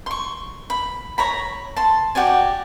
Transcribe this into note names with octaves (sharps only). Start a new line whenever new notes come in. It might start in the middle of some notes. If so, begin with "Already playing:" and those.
C6 C#6
B5
C#5 A#5 B5
A5 C6
F#4 G4 D5 G#5